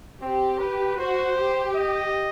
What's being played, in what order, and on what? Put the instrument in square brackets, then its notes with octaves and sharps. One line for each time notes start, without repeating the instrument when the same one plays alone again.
[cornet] C4 [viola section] G4
[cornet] B4
[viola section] F#4 [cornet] C5
[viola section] G4
[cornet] D#5